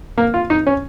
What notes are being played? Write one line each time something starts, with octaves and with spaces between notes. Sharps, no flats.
A#3
F4
D#4
C#4